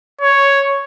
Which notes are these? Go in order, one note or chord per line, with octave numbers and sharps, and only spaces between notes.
C#5